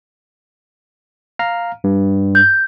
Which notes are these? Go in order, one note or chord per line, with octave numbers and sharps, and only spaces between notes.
F5 A#5 F6
G2
G6